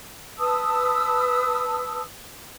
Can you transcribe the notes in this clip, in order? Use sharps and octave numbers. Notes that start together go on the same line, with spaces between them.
B4 A5 D#6 E6